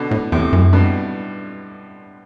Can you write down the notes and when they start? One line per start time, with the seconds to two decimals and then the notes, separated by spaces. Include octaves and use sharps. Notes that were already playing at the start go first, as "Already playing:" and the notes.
Already playing: B2 D3
0.11 A2
0.32 E2 A2 C3
0.53 F#2
0.73 G2 B2